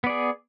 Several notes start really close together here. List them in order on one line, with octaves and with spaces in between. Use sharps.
B3 D5 G#4